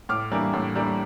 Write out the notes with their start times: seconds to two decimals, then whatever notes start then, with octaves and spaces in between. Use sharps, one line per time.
0.09 A2 D6 F6
0.31 E3 G3 A#3 D4
0.53 A2
0.75 E3 G3 A#3 D4